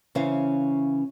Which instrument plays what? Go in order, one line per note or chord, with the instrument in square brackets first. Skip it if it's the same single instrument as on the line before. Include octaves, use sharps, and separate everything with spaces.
[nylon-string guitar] C#3 E3 C#4 C5 E5 F5